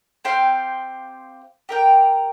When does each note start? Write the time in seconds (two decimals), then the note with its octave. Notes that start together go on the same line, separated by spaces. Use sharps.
0.25 C4 G4 C5 F5
1.69 G4 A#4 G5